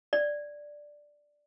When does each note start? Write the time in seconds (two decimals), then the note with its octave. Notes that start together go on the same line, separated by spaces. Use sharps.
0.13 D5